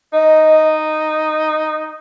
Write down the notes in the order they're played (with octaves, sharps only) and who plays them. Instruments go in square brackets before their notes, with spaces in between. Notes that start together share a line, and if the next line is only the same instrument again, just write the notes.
[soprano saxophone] D#4 [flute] D#5